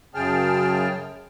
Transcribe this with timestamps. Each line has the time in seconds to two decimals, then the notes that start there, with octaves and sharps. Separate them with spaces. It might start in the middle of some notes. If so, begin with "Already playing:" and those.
0.15 F#2 C#3 G#4 G5 A5 F6